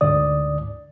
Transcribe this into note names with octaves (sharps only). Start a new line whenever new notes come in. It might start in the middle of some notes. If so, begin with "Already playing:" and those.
D2 G#2 D3 D5 D#6